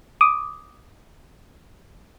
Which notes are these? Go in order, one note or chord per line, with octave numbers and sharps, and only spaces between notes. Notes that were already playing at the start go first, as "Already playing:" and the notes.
D6 D#6